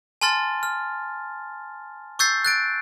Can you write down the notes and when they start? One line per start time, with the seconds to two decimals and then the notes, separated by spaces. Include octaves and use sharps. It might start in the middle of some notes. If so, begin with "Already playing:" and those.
0.21 G#5 A5 C6 F6 A6
0.63 F6
2.19 C#6 E6 G6 A6 C7
2.45 F#6 A6 D7